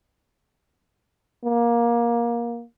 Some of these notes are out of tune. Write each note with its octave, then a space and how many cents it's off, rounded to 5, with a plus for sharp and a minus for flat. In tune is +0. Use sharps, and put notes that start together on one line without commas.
A#3 +20